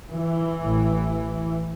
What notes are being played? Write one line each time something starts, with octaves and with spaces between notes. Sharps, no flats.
E3
A1 A2